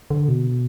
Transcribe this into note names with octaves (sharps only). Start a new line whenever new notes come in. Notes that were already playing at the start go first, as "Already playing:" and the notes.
D3
B2